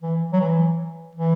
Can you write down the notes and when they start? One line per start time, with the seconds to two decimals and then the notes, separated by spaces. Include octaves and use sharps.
0.02 E3
0.33 F#3
0.41 E3
1.15 E3